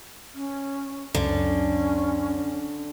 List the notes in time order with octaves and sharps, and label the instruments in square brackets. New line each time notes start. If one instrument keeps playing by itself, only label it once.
[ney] C#4
[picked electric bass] C#2 F#2 [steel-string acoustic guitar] D3 [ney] C#4